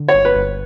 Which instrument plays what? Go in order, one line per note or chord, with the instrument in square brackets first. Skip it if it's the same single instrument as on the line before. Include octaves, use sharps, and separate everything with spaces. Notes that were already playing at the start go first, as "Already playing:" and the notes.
Already playing: [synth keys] D3
[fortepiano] C#5
[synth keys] G1
[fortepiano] B4
[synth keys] G1